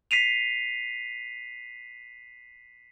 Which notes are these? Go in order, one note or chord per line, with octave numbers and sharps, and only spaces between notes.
B6 C7 D#7 F7